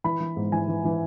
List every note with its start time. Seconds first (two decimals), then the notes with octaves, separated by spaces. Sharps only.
0.04 E3 B5
0.20 E3
0.37 G#2
0.52 E3 G#5
0.68 E3
0.85 E3